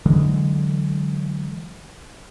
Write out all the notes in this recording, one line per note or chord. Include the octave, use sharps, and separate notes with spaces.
D3 E3 F#3 G#3